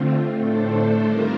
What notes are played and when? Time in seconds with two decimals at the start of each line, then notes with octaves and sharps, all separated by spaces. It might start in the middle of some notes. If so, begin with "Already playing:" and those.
Already playing: D3 A3 C4 F4
0.37 A2 A3 D4 A4 C5
1.06 D#3 G3 C4 F4 A#4